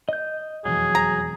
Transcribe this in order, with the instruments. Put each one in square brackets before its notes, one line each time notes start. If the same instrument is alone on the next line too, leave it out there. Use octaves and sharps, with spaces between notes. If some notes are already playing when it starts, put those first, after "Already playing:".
[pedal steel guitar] D#5 G6
[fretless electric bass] E1 F2 E3 [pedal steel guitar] F#3 [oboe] G#4
[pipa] A#5